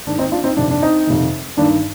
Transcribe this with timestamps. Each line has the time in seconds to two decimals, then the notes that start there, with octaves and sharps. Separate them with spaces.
0.07 G#2 D#3 D4
0.19 C4 D#4
0.32 D4 F4
0.44 C4 D#4
0.57 F2 C3 D#3 D4
0.71 D4
0.82 C4 D#4
1.07 F2 C3 D#3
1.57 G2 D#3 D4